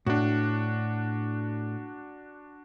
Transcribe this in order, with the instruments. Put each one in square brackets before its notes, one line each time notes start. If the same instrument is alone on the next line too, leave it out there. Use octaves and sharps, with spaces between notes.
[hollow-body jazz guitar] A2 [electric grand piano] D4 F#4